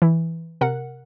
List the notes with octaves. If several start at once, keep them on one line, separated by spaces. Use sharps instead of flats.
E3
C3 A#4 F#5